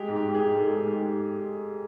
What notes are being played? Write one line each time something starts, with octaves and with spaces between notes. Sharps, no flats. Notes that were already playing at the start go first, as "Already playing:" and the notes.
Already playing: G#3 G4
G#2
G4
G#2
G#4
G#2 G4
G#2 A4
G#4
G#2
G#2 G4